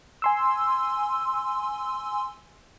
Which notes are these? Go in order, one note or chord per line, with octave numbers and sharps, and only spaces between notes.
G#5 C6 E6